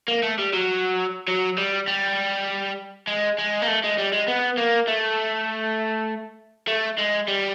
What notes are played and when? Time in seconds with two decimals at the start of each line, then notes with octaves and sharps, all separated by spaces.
0.08 A#3
0.23 A3
0.38 G3
0.53 F#3
1.28 F#3
1.58 G3
1.88 G3
3.08 G#3
3.39 G#3
3.62 A#3
3.68 A3
3.84 G#3
3.98 G3
4.12 G#3
4.28 B3
4.58 A#3
4.88 A3
6.68 A3
6.98 G#3
7.28 G3